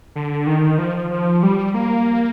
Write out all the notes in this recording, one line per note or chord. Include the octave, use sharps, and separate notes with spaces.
D3
D#3
F3
F3
G3
A#3